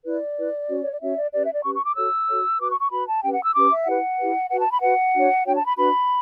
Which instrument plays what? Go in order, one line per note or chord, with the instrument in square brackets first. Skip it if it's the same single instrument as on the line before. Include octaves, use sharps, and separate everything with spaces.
[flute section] E4 B4 D5
E4 B4
C#4 F#4 C#5
C#5
D5
C#4 F#4 C#5 E5
D5
C#4 G4 B4 D5
E5
D5
C#4 G4 B4 C#6
C#6
D6
F#4 A4 C#5 E6
F#4 A4 C#5
F#4 B4 D6
C#6
C#6
F#4 B4 B5
A5
C#4 G4 B4 G5
F#5
E6
C#4 G4 B4 D6
E5
E4 G4 B4 F#5
E4 G4 B4
F#4 B4 F#5
A5
B5
F#4 B4 F#5
D4 F#4 C#5
D4 F#4 C#5 G5
A5
B5
D4 F#4 B4 B5